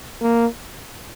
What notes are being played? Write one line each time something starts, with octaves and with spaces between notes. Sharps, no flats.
A#3